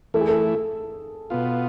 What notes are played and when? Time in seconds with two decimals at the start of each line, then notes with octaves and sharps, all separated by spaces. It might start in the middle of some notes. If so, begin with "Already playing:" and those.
0.14 E3 A3 E4 A4
0.21 G#4
0.29 A4
1.30 B2 B3 F4